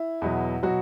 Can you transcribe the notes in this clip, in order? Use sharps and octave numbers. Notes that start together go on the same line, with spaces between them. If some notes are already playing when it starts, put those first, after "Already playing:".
Already playing: E4
E2 B2 F#3
B2 F#3 F#4